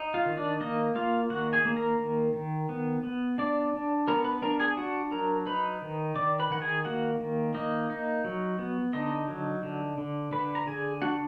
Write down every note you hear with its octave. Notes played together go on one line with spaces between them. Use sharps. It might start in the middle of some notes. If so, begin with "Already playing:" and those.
Already playing: D#4
F4 F5
D#3
D4 D5
A#3 D#4 D#5
A#3 F4 F5
D#3 F#4 F#5
G#4 G#5
A#3
A#4 A#5
D#3
D#3
B3
B3
D4 D5 D6
D4
B3 A#4 A#5
B4 B5
D4 A#4 A#5
G#4 G#5
D4 F#4 F#5
F#3 A#4 A#5
D#4 B4 B5
D#3
D#3 D5 D6
B4 B5
D#3 F#5
G#4 G#5
A#3 F#4 F#5
D#3
A#3 D#4 D#5
D#4
F#3
B3
D3 D#4 D#5
F#3
D3
D3
D3 B4 B5
A#5
D3 G#4 G#5
D4 F#4 F#5